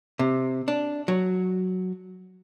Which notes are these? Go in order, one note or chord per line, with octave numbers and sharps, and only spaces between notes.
C3
D4
F#3